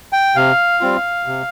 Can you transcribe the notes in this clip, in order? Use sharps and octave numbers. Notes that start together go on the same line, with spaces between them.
G5
C3 F5
G3 C4 F4
C3